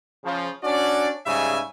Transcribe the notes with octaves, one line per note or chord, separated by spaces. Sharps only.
C#3 F3
C#4 D4 F#4 D5
G#2 C#3 G3 E5 G#5